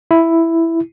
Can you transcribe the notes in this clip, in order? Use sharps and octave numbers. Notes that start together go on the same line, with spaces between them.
E4